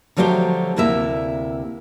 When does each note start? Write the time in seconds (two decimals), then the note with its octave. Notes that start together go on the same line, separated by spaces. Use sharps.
0.17 D3 F3 F#3 A3 G4 C5
0.76 D2 C3 A#3 E4 E5